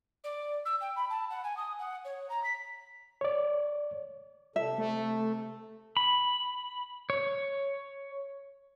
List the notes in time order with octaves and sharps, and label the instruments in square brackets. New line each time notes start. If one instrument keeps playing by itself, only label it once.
[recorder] D5
E6
G5
B5
A5
F#5
G#5
D#6
F#5
C#5
A#5
B6
[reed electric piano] C#5 D5
[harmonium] C3 A4 [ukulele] E5
[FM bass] A3
[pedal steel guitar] B5
C#5